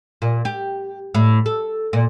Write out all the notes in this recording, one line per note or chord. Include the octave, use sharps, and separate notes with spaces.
A#2
G4
A2
A4
A#2